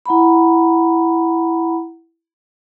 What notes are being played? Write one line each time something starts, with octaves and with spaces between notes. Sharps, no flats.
E4 F#5 A#5 B5